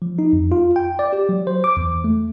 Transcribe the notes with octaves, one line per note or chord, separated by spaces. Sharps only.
F3
D#4
F2
F4
G5
D5
G4
F#3
C5
D6
E2
A3